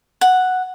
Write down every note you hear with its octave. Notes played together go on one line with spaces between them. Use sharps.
F#5